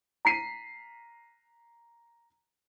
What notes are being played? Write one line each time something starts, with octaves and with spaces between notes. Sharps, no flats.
A#5 B6 C7 D#7